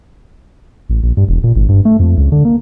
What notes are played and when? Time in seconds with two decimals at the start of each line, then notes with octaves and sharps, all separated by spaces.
0.89 A1
1.03 A#1
1.17 G2
1.29 E1
1.44 A#2
1.56 G#1
1.69 G2
1.85 A3
2.00 F2
2.17 C#2
2.32 D3
2.45 A#3